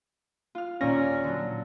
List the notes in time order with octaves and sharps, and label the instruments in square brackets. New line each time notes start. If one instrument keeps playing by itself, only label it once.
[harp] F4 F6
[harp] D#2 [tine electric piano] A#2 D5 A#6 [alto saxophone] C#4
[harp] D3 F#3